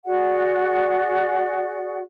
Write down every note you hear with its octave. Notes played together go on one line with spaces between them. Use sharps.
F#4 G#4 D5 F#5